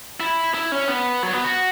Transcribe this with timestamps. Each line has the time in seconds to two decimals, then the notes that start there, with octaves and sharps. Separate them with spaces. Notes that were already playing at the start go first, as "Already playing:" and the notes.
0.20 E4
0.54 E4
0.72 C#4
0.88 B3
1.23 F#3
1.33 B3
1.44 F#4